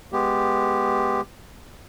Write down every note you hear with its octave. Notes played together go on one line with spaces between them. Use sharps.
G#3 B3 G4